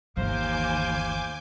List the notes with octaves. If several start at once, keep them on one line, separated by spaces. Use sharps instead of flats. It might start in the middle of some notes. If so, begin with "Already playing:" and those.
G1 D#2 E3 C5 F5 G#5 D6 G6